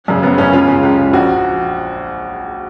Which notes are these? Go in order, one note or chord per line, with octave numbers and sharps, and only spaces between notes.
F#2 C#3
F#1 B3
F#2 C#3 C#4
C#2 F4
C#3
C#2
C#3
A#1 F#4